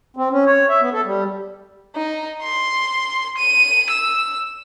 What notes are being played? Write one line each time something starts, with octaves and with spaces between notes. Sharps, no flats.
C4
C#4
C#5
E5
B3
A4
G3
D#4
C6
D#7
E6